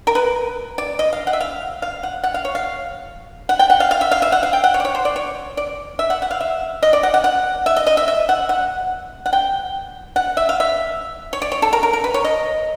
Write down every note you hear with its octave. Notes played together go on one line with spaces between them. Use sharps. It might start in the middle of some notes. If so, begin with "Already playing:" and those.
A#4
B4
D5
D#5
F5
F#5
E5
F5
F5
F#5
F#5
F5
C#5
F5
F#5
G5
F#5
F5
F5
E5
F5
E5
F#5
F5
G5
F#5
C#5
D5
C#5
C5
D5
C#5
D5
E5
F#5
F#5
F5
E5
D#5
D5
F#5
F#5
F#5
E5
D#5
D#5
E5
E5
F#5
F#5
F#5
G5
F#5
E5
F5
E5
C#5
D5
C#5
A4
A#4
A#4
A#4
B4
C#5
D#5